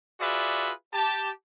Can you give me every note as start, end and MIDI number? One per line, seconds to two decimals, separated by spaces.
0.21 0.71 65
0.21 0.71 66
0.21 0.71 68
0.21 0.71 71
0.21 0.71 74
0.21 0.71 76
0.93 1.29 67
0.93 1.29 81